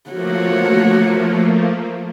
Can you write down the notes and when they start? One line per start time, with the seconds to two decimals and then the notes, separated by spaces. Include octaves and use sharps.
0.10 F3 A3 A#3 F#4 C#5